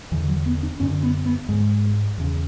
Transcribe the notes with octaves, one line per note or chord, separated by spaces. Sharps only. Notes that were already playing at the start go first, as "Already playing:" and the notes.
E2 D3 E3
F#3
B3
D4
F#2 D3 C#4
B3
B3
G#2 G#3
E2 C#3